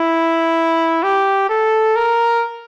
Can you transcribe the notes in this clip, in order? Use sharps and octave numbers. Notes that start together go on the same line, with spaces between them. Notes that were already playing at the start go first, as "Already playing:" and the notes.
Already playing: E4
G4
A4
A#4